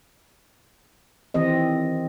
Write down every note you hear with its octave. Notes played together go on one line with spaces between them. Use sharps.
D#3 E3 C4 G4 D#5